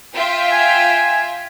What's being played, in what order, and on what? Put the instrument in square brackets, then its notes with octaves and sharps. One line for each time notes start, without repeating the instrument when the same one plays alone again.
[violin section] F4 E5 G5
[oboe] G#5